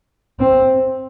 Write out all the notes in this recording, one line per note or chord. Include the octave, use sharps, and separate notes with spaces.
C4